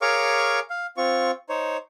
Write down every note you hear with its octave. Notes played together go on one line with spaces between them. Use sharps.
G#4 A#4 C#5 F5 C#6 D6
F5
C4 F4 C#6
D#4 C5 C#5